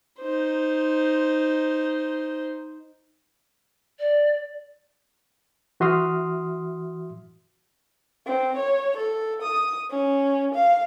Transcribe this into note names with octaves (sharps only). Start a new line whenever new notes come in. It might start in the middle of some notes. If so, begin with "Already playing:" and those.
D#4 C5
D5
E3 F#4 E5 C6 D#6 F6
C4
C#5
A4
D#6
C#4
F5